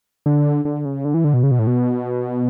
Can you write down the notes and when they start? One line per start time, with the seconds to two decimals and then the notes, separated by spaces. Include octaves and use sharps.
0.26 D3
0.65 D3
0.85 C#3
1.05 D3
1.14 E3
1.24 D3
1.34 B2
1.43 C#3
1.51 B2
1.59 A2
1.67 B2